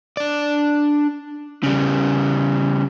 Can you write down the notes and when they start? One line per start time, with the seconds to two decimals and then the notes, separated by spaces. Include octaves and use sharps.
0.17 D4 D5
1.63 C#3 G3